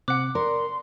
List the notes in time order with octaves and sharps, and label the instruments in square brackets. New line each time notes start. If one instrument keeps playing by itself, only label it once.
[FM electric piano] C3 C4 F#6 [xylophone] F#5 D6
[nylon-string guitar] A#4 [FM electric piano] D5 [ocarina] C6